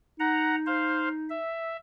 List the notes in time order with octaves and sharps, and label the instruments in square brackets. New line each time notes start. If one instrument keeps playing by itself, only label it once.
[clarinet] D#4 [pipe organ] F#5 A#5
[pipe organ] C5 F5
E5